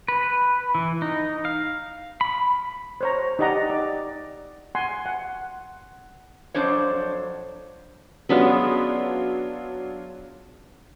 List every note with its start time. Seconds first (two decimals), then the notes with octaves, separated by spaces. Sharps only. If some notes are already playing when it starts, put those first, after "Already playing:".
0.08 B4
0.75 E3
1.02 D#4
1.45 F5
2.21 B5
3.01 C5 C#5 A#5
3.39 D#4 G4 D5 D#5 F#5 A#5
3.70 D5
4.75 F#5 G#5 C6
5.06 F#5
6.54 F2 F#3 D4 C5 C#5
8.29 F#3 G#3 B3 C#4 D4 F4